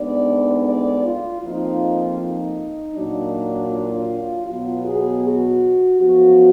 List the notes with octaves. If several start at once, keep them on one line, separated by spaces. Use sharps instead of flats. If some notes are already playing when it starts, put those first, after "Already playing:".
Already playing: D2 D3 G#3 B3 D#4 D5
D5
F4
F2 F3 A#3 D#4 F4
D#4
A#2 F#3 D4
F4
B2 F#3 B3 F4
G#4
F#4
F#2 F3 B3 F#4